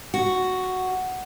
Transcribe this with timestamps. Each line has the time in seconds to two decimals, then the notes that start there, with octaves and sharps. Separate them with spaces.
0.14 F#4